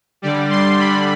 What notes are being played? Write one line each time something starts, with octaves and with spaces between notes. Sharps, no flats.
D3 G3 D5
C6
D3 G3 B5